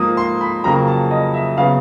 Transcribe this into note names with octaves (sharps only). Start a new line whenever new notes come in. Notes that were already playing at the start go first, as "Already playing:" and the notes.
Already playing: G#2 F3 A#3 D#6
C6
B5
F2 C#3 F#3 A#3 A#5
A5
D#5
E5
C#3 F#3 B3 F5